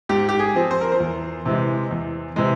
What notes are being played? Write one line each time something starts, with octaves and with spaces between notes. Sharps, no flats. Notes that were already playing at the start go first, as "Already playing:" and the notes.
G#2 G4
G4
G#4
F3 C4
C5
A#4
C5
E2
C3 E3 G#3
E2
C3 E3 G#3